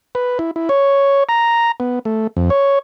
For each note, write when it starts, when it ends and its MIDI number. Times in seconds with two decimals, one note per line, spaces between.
0.15 0.38 71
0.39 0.51 64
0.56 0.69 64
0.69 1.24 73
1.29 1.72 82
1.80 1.99 59
2.05 2.27 57
2.37 2.50 41
2.50 2.79 73